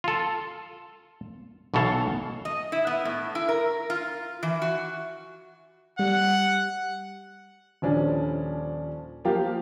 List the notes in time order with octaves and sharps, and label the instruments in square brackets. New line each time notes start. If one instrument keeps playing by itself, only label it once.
[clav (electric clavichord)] F4 A4
B1 B2 E3 A4 C#5 F5
[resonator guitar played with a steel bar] D#5
E4
B3
A2
E4
A#4
F4
E3
F#4
[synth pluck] G3 [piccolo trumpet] F#5
[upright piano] D#1 F3 C#4 D4
F3 A#3 G4 F5